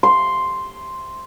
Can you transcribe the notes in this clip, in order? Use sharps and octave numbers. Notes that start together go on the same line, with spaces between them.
C6